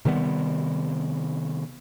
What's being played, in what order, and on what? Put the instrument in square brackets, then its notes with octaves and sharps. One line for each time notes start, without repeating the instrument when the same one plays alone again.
[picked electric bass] C3 D#3 G3 B3